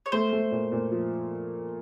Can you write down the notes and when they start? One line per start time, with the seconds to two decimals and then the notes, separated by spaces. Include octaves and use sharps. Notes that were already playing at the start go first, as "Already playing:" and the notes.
0.06 C#5
0.12 A3 C5
0.33 A3
0.51 A#2
0.72 A#2
0.92 F3